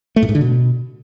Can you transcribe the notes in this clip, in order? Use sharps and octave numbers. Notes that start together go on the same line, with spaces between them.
A3
A2
G#2
D3
B2